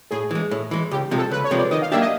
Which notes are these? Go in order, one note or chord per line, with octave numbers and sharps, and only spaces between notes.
A2 G#4
E3 G#3
A2
E3 G#3
C#2 G4
C3 F3 G#3
A4
C#2 B4
C#5
C3 F3 G#3
D5
D#3 D#5
F5
F#3 A#3 D4 G4 E5
D#5